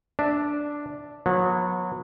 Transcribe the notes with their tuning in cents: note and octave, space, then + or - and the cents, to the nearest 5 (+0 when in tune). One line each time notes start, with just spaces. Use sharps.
D4 +0 E5 -15
F#3 -30 B3 -20